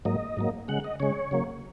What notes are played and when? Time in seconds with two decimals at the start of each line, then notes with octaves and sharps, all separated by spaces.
0.05 G#2 F#3 A#3 D#5
0.37 G#2 F#3 A#3
0.68 C#3 G#3 F#5
0.84 D#5
1.00 C#3 G#3 C#5
1.31 C#3 F#3 A#3